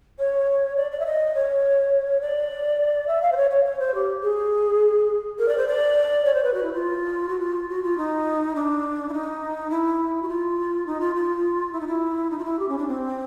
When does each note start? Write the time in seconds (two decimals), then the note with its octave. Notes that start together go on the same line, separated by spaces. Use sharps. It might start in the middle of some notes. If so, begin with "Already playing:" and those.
0.19 C#5
0.77 D5
0.91 D5
1.00 E5
1.06 D#5
1.35 C#5
2.21 D5
3.08 E5
3.22 F5
3.32 C5
3.37 C#5
3.51 C#5
3.65 C#5
3.80 C5
3.95 G4
4.23 G#4
5.39 A#4
5.48 D5
5.58 C5
5.68 D5
6.25 C#5
6.34 C5
6.44 B4
6.54 F#4
6.63 E4
6.73 F4
7.29 F#4
7.40 F4
7.69 F#4
7.83 F4
7.98 D#4
8.55 D4
9.09 E4
9.13 D#4
9.70 E4
10.22 F#4
10.29 F4
10.87 D#4
11.01 F4
11.15 F4
11.73 E4
11.80 D#4
11.87 E4
12.30 D#4
12.39 F4
12.45 E4
12.59 G4
12.69 C#4
12.78 D4
12.88 C4